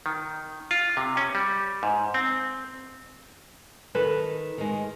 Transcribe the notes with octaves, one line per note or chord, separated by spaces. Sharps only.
D#3
F4
C3
C#4
G3
G#2
C4
D#3 A4 B4
D#3 G#3